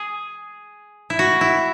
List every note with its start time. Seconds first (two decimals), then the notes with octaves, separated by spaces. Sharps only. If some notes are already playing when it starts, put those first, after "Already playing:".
Already playing: G#4
1.10 E4
1.19 F#4
1.41 E4